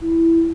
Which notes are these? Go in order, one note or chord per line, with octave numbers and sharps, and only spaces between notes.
E4